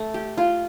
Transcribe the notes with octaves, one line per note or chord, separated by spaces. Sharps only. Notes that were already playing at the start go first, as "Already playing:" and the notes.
Already playing: A3
G4
F4